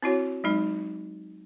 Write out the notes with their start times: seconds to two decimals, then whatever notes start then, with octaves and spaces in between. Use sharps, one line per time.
0.02 C4 E4 F#4 C#5
0.44 F#3 G#3 D#4